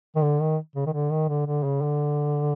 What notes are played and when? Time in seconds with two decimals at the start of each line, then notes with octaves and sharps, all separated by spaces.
0.16 D#3
0.23 D3
0.41 D#3
0.76 C#3
0.86 D#3
0.93 D3
1.11 D#3
1.29 D3
1.46 D3
1.63 C#3
1.81 D3